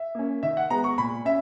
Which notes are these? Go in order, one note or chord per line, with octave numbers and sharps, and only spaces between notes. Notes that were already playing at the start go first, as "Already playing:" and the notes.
Already playing: E5
A#3 C#4
D#3 E5
F#5
G#3 B3 A#5
C#6
A#2 B5
C#4 E5